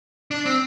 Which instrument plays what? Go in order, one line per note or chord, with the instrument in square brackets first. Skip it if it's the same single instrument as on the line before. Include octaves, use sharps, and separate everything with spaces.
[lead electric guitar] D4
C4